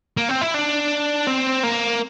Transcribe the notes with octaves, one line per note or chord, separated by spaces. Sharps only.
A#3
C4
E4
D4
C4
A#3